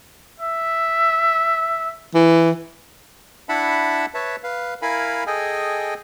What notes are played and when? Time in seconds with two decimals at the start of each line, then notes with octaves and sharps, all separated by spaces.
0.40 E5
2.14 E3
3.49 D4 E4 E5 F#5 A5 B5
4.14 B4 C#5 E5 A5
4.44 B4 F5
4.82 E4 A#4 F5 G#5 B5
5.27 G#4 A4 D#5 G5 G#5